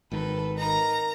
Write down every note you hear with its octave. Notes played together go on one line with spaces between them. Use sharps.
G#1 G#2 D#3 A4 B4
D#4 A#4 A#5 A#6